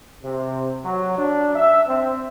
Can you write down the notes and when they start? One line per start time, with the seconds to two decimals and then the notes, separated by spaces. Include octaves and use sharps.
0.23 C3
0.85 F#3
1.17 D4
1.55 E5
1.87 C4